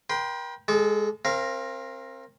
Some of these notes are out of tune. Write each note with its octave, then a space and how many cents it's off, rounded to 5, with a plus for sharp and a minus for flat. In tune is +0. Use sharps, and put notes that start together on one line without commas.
A#4 +45 G5 +0 C6 -20
G#3 -10 A4 -35 D6 -40
C4 +25 A#4 +0 F5 -25